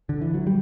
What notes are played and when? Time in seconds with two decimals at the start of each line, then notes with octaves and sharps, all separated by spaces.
0.09 D3
0.21 E3
0.34 F#3
0.47 G3